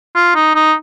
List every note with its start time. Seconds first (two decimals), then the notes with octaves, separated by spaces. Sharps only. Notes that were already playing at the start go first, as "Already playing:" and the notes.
0.15 F4
0.35 D#4
0.55 D#4